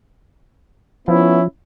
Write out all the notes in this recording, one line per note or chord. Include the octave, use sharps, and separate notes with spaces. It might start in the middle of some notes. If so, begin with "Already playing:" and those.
F3 B3 C#4 E4